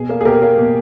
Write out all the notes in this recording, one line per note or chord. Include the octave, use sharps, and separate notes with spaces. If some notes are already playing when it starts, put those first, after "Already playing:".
Already playing: B2 G#4
A#3
G#4
B2 G4 A#4
A#3
B2